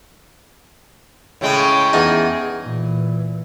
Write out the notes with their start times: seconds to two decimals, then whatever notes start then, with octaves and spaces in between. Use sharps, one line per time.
1.41 A2 C#3 G#3 G5
1.93 E2 D#4 G#4
2.63 A#2 E3